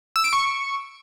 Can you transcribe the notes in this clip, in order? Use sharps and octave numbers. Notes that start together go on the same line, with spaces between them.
E6
D7
C#6